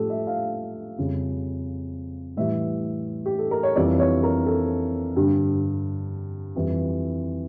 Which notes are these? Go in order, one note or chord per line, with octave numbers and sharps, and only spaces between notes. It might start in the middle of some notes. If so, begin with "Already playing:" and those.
Already playing: A2 F3 G4 A4
E5
F5
F2 C#3 G3
A2 E3 G3 E5
G4
A4
A#4
C#5
F2 E3 G3 D5
C#5
A#4
A4
G2 D3 G3
F2 E3 G3 E4